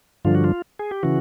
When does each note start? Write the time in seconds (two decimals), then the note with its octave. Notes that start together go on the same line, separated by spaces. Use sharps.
0.25 G2 D3 F3 F4
0.35 F#4
0.44 F4
0.79 G#4
0.91 G4
1.03 C#3 E3 F#4